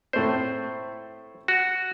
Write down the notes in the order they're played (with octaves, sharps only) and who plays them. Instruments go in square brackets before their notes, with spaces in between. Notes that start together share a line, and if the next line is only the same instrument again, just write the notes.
[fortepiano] A2 A3 C4 [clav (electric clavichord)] C5
[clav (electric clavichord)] F#4